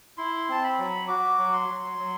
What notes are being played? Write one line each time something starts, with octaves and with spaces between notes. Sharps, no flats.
E4 C6
C4 A5
B5
F#3
F#4 D6
F#3
C6
F#3
F#3